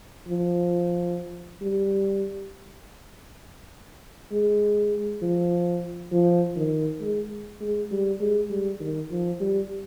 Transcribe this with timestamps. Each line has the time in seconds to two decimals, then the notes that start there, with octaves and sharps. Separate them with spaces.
0.27 F3
1.62 G3
4.32 G#3
5.22 F3
6.12 F3
6.56 D#3
7.01 G#3
7.61 G#3
7.91 G3
8.20 G#3
8.50 G3
8.80 D#3
9.11 F3
9.40 G3